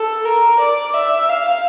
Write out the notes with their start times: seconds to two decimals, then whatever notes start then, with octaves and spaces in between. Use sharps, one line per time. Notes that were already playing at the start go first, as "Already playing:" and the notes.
Already playing: A4
0.25 A#4
0.59 D5
0.93 E5
1.29 F5